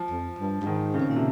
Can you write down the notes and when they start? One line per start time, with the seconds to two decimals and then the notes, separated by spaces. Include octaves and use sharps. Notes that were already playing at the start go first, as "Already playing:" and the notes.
Already playing: F3
0.11 F2
0.38 G2
0.62 G2
0.66 G#2 D#3
0.94 C#3
1.00 C3
1.09 A#2
1.16 C3